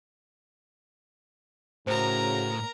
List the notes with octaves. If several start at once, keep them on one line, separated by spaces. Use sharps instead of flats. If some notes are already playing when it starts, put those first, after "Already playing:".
A2 C#3 F#4 A#4 C5 A#5